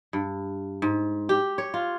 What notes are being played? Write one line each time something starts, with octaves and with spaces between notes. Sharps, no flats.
G2
G#2
G4
C#5
F4